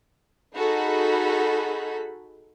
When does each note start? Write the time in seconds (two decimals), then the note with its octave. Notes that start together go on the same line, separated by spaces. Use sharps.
0.56 D#4 F#4 G#4 A4 B5